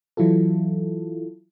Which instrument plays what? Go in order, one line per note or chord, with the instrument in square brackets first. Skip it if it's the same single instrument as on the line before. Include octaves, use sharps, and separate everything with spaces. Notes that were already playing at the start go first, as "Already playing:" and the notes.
[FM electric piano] E3 F#3 E4 F4 A4